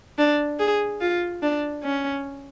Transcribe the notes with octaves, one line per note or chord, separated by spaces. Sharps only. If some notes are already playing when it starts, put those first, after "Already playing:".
D4
G#4
F4
D4
C#4